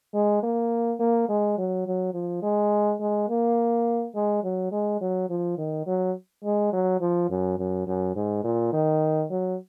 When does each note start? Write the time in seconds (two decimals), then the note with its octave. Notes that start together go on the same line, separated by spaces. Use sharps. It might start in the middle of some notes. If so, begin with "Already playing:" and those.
0.14 G#3
0.43 A#3
1.00 A#3
1.29 G#3
1.58 F#3
1.86 F#3
2.14 F3
2.43 G#3
3.00 G#3
3.29 A#3
4.15 G#3
4.43 F#3
4.72 G#3
5.01 F#3
5.30 F3
5.58 D#3
5.86 F#3
6.44 G#3
6.73 F#3
7.01 F3
7.30 F#2
7.58 F#2
7.87 F#2
8.16 G#2
8.44 A#2
8.73 D#3
9.30 F#3